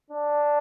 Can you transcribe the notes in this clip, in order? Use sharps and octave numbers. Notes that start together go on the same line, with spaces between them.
D4